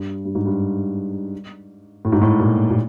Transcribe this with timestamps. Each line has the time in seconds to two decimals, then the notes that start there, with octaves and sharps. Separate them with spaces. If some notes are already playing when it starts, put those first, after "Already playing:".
Already playing: G2
0.25 G2
0.35 G#2
0.46 G2
2.05 A2
2.12 G#2
2.22 A2
2.39 A#2
2.70 A#2